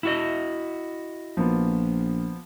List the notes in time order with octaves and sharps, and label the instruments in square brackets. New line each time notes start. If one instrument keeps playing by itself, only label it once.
[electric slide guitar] E4 F#4 D#5
[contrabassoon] A#1 [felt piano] F3 A#3 B3